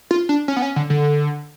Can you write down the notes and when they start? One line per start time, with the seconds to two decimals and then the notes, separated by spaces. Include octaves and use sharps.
0.11 F4
0.29 D4
0.48 C#4
0.56 B3
0.62 C#4
0.76 D3
0.90 D3